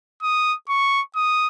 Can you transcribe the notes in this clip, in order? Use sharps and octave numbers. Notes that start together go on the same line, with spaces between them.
D#6
C#6
D#6